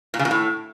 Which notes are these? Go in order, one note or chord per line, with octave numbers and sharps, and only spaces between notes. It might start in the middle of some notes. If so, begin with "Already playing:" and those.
A#2
C#3
A#2
A2